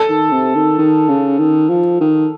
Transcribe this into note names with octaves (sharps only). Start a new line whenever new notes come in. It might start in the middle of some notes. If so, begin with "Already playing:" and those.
Already playing: A4
D#3
C3
D#3
D#3
C#3
D#3
F3
D#3